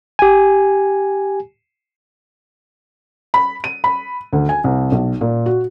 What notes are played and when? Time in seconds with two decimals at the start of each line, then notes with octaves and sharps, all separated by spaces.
0.19 G4 G#5
3.34 B5
3.64 D#7
3.84 B5
4.33 D2
4.49 G#5
4.64 C2
4.92 B1
5.21 A#2
5.46 F#4